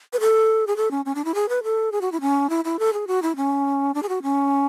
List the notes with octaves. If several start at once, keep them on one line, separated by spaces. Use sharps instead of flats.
B4
A4
G#4
A4
C#4
C#4
D4
E4
G#4
B4
A4
G#4
F#4
E4
C#4
E4
E4
A4
G#4
F#4
E4
C#4
D4
G#4
F#4
C#4